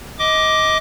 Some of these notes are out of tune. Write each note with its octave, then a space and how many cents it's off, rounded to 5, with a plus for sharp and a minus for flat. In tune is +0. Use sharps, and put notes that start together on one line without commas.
D#5 +20 D6 +0